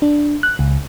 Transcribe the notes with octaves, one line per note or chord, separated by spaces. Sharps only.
D4
F#6
C#2